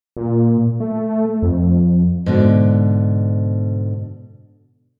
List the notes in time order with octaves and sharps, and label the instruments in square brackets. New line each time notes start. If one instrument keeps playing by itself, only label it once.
[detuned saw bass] A#2
A3
F2
[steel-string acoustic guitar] G#2 B2 D3